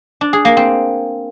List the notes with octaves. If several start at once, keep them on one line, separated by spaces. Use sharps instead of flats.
D4
G#4
A#3
C4